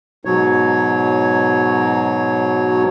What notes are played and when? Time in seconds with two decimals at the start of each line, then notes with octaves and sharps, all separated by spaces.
0.25 G#2 B2 F#3 C#5